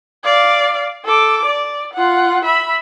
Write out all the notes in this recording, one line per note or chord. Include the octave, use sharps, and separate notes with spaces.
D5 F5
A4 D6
D5
F4 F#5
E5 B5